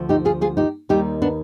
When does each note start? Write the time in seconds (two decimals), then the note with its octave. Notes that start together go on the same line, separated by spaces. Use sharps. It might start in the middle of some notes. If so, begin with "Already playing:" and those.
Already playing: D2 D3 F3
0.09 D#4 G4
0.25 F4 G#4
0.41 F4 G#4
0.57 D#4 G4
0.89 D#2 D#3 G3 D#4 G4
1.22 B3 D4